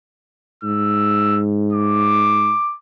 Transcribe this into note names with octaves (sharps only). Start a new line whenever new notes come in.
G#2 E6
D6